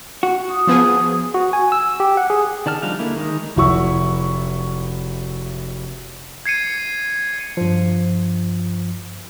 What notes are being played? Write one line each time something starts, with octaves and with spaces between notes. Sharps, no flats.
F#4
D#6
F3 B3 G#4
F#4
G#5
E6
G4
F#5
G#4
D#3 D5 A5 F6
F3 G3 D4 D#4 F5
D3 A#3 E4
D#3 G#3 D#4
F1 F#3 E4 F#4 C#6 E6
G#6 C7 C#7 D#7
G2 F3